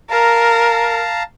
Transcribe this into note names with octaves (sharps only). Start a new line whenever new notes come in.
A#4 F5 A5 A#5